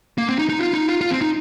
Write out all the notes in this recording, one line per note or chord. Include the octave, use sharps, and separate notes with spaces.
A#3
C4
D#4
D#4
F4
D#4
F4
F4
C4
D#4